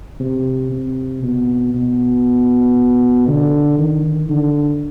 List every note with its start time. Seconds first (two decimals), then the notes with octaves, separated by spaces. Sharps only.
0.20 C3
0.71 C3
1.23 B2
1.74 B2
3.28 D3
3.79 D#3
4.29 D3